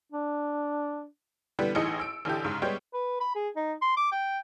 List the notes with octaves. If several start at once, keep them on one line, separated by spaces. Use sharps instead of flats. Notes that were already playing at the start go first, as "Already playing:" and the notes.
D4
D3 E3 G3 B3
A1 A2 D#4 G#4 D#5 C#7
E6 D7
A1 D3 D4 E4 G4
G#2 C#3
G3 G#3 B3 G4 C#5
B4
B5
G#4
D#4
C6
D6
G5